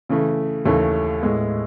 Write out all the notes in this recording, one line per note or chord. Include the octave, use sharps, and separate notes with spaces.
C#3 E3 A3
D#2 C#3 E3 A3 C#4
A2 G#3 B3